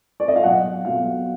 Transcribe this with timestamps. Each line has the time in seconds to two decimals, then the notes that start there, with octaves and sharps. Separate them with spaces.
0.20 D5
0.28 D#5
0.36 F5
0.43 B1 F#5
0.84 B2 F#3 F5